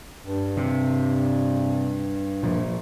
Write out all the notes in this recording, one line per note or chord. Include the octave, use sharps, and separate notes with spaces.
G2
C3
A#2 F3